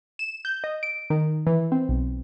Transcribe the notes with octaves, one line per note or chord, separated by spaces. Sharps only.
E7
G6
D#5
D7
D#3
E3
C4
B1